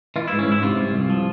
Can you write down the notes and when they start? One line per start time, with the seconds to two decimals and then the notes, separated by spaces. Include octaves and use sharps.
0.16 E3 F4
0.28 G#2 E4
0.39 C#4
0.48 G#2 E4
0.62 C3 F4
0.78 C2
0.94 C2
1.10 F3